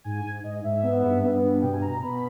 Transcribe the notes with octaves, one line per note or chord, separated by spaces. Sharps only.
G#2 G#5
G#2
G#2 D#5
G#2 E5
B3
G2
B3
G2
B2 G5
G#5
B2 A#5
A#5
B2 B5